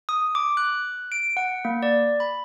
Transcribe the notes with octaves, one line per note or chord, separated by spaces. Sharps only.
D#6
D6
F#6
D7
F#5
A#3
D5
B5